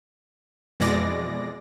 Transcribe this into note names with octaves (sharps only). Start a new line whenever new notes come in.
F2 B2 E3 G#3 D5 A#6